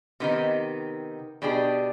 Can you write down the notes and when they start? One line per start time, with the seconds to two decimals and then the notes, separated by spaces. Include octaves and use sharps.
0.20 C3 D#3 B3 D#4
1.42 B2 G3 D4 G#4